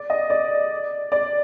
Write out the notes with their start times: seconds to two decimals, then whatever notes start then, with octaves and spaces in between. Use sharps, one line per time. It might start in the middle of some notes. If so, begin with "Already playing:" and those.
Already playing: D5
0.10 D#5
0.30 D5
1.12 D5